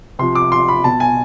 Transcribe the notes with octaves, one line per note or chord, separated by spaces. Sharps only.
C3 F3 C6
D6
C6
B5
B2 A5
G#5